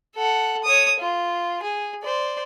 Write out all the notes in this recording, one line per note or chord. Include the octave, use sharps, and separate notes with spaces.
A4 F#5
C#5 D#6
F4
G#4
C5 D5